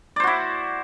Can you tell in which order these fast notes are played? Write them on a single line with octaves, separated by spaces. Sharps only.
D5 C5 F#4 E4